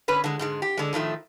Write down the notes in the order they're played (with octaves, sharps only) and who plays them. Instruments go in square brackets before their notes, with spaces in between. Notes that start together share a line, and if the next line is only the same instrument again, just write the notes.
[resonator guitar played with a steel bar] D3 C#4 B4
D3 G#3
G#2 D3 G#3
G4
D3 G#3
A2 D#3 F3 A3